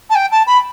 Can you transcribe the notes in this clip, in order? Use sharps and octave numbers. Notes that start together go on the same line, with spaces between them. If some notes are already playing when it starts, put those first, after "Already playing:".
A5
G5
A5
B5